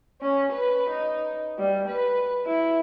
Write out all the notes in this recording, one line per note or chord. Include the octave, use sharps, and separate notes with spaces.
C#4
B4
D#4
G3
B4
E4